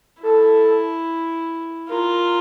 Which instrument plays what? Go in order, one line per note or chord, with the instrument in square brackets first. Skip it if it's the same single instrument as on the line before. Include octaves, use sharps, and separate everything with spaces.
[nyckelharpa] E4 [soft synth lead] A4
[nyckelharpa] F4 [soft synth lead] A#4